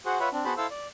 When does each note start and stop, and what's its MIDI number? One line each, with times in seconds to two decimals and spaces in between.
0.06 0.19 66
0.06 0.19 68
0.06 0.19 72
0.06 0.19 78
0.20 0.29 65
0.20 0.29 71
0.20 0.29 73
0.20 0.29 76
0.20 0.29 78
0.20 0.29 83
0.32 0.44 60
0.32 0.44 62
0.45 0.54 59
0.45 0.54 66
0.45 0.54 68
0.45 0.54 72
0.45 0.54 81
0.45 0.54 83
0.57 0.67 64
0.57 0.67 69
0.57 0.67 72
0.57 0.67 77
0.57 0.67 88
0.71 0.88 74